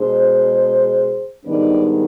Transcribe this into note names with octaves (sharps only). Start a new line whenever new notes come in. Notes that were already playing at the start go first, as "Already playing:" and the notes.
Already playing: B2 G#3 D4 G#4 C5
G#2 D#3 G3 B3 D4 B4 D5